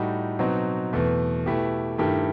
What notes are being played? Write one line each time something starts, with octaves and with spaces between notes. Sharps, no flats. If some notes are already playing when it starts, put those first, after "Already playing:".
Already playing: A2 G3 D#4 F#4
B2 F#3 C4 D#4 F#4
E2 B2 A3
B2 A3 E4 G4
G2 D#3 A3 E4 G4